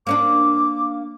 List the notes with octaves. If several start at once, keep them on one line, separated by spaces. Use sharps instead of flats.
A#3 C#4 D4 D6